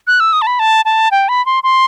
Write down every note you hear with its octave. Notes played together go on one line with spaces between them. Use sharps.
F#6
E6
D#6
A5
B5
A5
A5
G5
B5
C6
C6